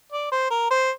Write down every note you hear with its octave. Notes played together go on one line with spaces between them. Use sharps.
D5
C5
A#4
C5